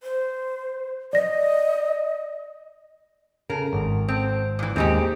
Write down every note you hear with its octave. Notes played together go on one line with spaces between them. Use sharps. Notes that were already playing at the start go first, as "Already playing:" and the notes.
C5
D5 D#5 A#6
C#3 A#4
G#1
C4
A#2 E3
D#2 G#3 C4 D#4 G4